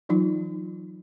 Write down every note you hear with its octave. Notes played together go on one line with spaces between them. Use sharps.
E3 F#3 D#4 F4